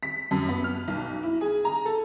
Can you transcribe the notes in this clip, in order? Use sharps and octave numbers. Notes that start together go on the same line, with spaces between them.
B6
F#2
B3
F6
B1
E4
G#4
A#5
A4